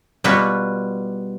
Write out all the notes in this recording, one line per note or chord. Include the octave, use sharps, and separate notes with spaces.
B2 G3 F4 B4 C#5